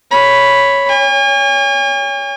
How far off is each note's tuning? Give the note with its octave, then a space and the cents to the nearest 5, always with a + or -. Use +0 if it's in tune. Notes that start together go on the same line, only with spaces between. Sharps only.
C#5 +0 B5 +0
C#5 +25 G#5 -40